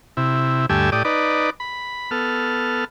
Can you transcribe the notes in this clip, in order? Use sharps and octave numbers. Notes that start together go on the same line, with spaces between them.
C3 E4
D2 G2 A3 G4 G#5 E6
A2 G4 D5 D#6
D#4 B4 D5
B5
B3 A4 F6